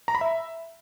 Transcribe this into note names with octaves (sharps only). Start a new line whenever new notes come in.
A#5
B5
E5